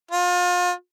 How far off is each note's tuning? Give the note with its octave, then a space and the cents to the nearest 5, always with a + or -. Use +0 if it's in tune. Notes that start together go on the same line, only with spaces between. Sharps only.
F4 +35